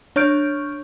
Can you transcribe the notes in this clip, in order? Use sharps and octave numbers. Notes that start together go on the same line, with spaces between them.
D4 C#5 C#6 F6 G6 D7